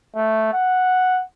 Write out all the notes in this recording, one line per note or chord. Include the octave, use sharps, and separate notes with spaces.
A3
F#5